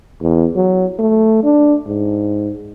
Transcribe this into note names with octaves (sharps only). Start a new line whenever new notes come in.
E2
F#3
A3
D4
G#2